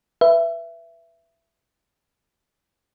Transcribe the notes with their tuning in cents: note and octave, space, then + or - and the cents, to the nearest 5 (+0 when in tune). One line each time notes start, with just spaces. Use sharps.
B4 +0 E5 +20